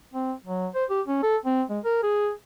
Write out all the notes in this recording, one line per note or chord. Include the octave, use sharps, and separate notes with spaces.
C4
F#3
C5
G4
C#4
A4
C4
G#3
A#4
G#4